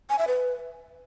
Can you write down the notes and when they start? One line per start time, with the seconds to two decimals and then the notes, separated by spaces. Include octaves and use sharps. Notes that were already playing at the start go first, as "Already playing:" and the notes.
0.10 G#5
0.19 E5
0.28 B4